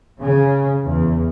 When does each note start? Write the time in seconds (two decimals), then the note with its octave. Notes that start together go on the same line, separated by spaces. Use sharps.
0.20 C#3
0.85 E2